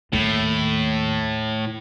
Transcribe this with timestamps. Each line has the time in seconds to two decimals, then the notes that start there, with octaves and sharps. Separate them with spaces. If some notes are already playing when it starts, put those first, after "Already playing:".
0.13 D#2 A2